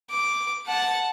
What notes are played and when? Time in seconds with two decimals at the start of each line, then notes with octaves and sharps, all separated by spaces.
0.10 D6
0.67 F#5 A5